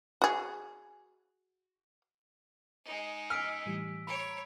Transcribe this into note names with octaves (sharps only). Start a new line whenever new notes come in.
F#4 G#4
G#3 D#4
E6 F6 B6 D7
A2 E3 G3
C#5 A#5 B5 D7